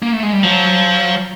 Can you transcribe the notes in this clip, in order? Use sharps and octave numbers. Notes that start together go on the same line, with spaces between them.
A#3
A3
G#3
G3
F3 F#3